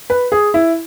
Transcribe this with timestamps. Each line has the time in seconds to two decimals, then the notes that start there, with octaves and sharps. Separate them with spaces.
0.10 B4
0.32 G#4
0.54 E4